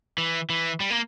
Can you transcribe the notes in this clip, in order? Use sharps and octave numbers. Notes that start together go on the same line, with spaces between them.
E3
E3
G3
A#3